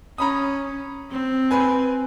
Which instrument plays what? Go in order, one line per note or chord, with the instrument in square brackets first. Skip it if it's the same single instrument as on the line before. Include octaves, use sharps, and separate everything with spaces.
[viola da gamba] C#4 [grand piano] A#5 B5 D#6
[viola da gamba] C4
[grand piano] B4 G#5